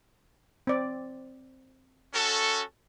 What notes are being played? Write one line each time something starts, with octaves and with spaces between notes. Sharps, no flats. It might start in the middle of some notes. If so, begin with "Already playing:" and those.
C4 D5
C#4 F#4 A4